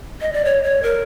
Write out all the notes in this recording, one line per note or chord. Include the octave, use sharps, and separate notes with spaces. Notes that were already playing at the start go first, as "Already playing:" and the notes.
D#5
D5
C#5
C#5
A#4